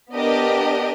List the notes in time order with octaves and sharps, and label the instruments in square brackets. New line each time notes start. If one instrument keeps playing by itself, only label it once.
[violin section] B3 D4 G4 A#4 D#5